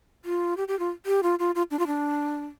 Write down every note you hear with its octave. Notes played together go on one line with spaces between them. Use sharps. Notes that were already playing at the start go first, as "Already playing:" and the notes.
F4
G4
G4
F4
G4
F4
F4
F4
D4
F4
D4